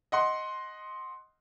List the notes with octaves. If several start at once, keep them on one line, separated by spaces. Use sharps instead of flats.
D#5 F#5 C6